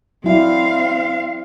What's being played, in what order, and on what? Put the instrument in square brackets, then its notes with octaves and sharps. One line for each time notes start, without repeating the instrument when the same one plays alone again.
[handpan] F#3 E4 D5 [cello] C4 F5